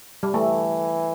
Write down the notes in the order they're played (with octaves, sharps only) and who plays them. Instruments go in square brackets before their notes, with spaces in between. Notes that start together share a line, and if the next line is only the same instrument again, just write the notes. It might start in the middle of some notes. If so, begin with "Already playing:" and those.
[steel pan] G3
[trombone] E3 [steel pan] A3